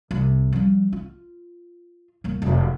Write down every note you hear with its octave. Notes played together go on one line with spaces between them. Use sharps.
C2 C4
F3 G3
F4
D#1 A#3
F1 F#2